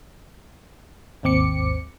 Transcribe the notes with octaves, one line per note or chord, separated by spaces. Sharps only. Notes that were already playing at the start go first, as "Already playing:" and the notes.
G#1 D#2 C4 D6 C#7